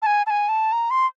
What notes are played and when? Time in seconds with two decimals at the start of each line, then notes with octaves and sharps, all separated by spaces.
0.02 A5
0.06 G#5
0.27 A5
0.30 G#5
0.49 A5
0.72 A#5
0.91 C6